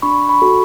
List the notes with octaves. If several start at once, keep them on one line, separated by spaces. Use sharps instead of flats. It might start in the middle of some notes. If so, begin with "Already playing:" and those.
D4 B5 C#6
B5 C#6
F#4 A4